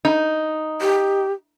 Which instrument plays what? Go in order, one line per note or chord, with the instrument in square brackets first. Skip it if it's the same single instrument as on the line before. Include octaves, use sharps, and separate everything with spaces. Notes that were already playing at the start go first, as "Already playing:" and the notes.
[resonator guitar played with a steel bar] D#4
[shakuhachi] G4